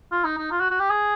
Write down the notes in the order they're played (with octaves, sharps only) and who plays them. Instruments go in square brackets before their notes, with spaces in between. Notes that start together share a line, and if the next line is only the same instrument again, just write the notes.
[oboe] F4
D#4
D#4
F4
F#4
F#4
G4
G#4